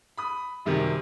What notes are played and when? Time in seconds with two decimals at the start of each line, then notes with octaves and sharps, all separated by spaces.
0.17 B5 D#6
0.65 F#2 C3 D#3 G3